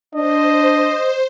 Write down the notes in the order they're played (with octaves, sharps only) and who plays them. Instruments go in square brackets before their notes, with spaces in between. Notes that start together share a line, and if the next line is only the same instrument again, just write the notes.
[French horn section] D4 [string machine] C5 [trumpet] D#5